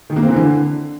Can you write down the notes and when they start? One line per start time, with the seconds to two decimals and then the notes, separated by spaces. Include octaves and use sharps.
0.10 D#3
0.16 A#3
0.23 C4
0.30 E3
0.36 D3